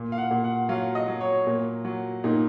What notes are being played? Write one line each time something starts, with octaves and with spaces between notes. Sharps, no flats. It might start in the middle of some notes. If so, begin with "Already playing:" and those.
Already playing: A#2
F5
F#5
A#2
F#5
F#3 F5
D#5
F#3
C#5
A#2
F#3
A#2 D#4